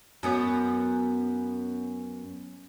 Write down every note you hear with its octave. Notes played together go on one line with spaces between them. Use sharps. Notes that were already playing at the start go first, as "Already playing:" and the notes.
F#2 B3 C#5